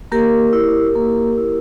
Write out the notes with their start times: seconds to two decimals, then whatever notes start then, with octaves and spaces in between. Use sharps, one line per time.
0.12 A#3 G4 A#4
0.53 E4
0.96 A#3
1.38 E4